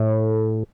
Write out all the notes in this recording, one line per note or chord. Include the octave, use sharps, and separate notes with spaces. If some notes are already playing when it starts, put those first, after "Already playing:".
Already playing: A2